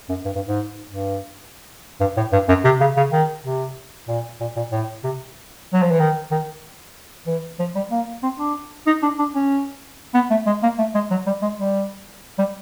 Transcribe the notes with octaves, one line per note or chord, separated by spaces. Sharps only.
F#2
G2
G2
G#2
G2
G2
A2
G2
F#2
C3
C#3
C#3
D#3
C3
A#2
A#2
A#2
A2
C3
F#3
F3
E3
D#3
D#3
E3
F3
G3
A#3
C4
D4
D#4
D4
D4
C#4
B3
A3
G#3
A#3
A3
G#3
F#3
G3
G#3
G3
G3